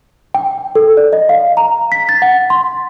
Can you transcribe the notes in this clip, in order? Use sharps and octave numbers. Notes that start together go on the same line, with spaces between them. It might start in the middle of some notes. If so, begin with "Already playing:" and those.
G5
A4
D5
D#5
F5
A#5
B6
A6
F#5
C6